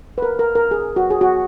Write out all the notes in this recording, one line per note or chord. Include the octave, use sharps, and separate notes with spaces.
B4
A#4
A#4
A#4
G#4
F#4
G#4
F#4